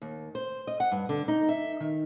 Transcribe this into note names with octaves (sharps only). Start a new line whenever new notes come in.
D#2
C5
D#5
F#5
G2
D3
D#4
E5
D#3